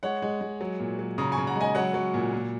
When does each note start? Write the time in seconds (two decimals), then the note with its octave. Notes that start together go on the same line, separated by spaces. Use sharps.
0.03 G#3 C#5 F#5
0.22 G#3
0.41 G#3
0.61 F#3
0.80 A#2
0.99 F#3
1.18 C#3 A#5 D#6
1.32 G#5 C#6
1.38 C#3
1.47 F#5 A#5
1.56 G#3 D#5 G#5
1.75 F#3 C#5 F#5
1.94 F#3
2.14 A#2
2.33 A#2